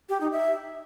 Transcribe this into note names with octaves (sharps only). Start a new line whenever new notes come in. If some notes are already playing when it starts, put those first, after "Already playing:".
G4
D#4
E5